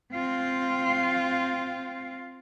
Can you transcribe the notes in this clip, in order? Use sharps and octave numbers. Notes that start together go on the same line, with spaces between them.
C4 F4